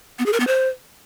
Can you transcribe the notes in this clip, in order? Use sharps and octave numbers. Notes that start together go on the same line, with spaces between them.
B3
G#4
A#4
B3
C5